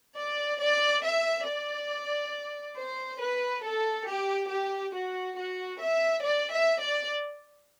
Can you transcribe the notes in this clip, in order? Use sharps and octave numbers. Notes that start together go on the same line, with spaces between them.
D5
D5
E5
D5
C5
B4
A4
G4
G4
F#4
F#4
E5
D5
E5
D5